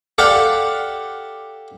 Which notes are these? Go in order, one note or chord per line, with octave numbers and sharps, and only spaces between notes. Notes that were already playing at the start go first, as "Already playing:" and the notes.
G4 A4 D5 F5 F#5 D6